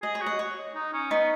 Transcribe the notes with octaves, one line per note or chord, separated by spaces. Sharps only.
G#4 D#5
C#5
F#4
D#5
C#5
D#4
C#4
B3 D#4